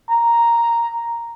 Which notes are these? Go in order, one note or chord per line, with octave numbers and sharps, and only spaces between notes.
A#5